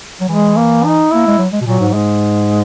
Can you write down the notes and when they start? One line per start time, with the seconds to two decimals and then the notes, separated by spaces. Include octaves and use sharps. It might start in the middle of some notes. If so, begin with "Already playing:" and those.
0.21 F#3
0.29 E3 G#3
0.56 A#3
0.84 D#4
1.11 A#3 E4
1.27 G#3
1.38 F#3
1.52 G#3
1.61 B2
1.66 A#2 F#3
1.80 G#2
1.89 F#3
1.94 G#2 G#3